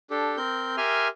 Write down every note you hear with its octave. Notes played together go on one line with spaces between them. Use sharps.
D4 G4 A4
C4 A#4 G6
G4 A#4 E5 G#5 C6 F6